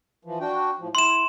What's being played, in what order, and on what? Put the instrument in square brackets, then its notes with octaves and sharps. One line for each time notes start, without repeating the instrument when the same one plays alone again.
[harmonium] E3 F3
D4 F#4 G5
A2 F3
[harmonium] E4 [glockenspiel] C6 E7